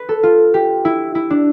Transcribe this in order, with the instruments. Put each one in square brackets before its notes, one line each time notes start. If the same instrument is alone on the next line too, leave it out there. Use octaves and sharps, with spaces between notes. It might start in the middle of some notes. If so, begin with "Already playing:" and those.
Already playing: [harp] B4
A4
F4
G4
E4
E4
D4